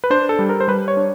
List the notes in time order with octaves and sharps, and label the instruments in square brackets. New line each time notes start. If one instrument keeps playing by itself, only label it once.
[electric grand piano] B4
D4 C5
A4
G3
A#4
C5
G3 B4
C#5
D4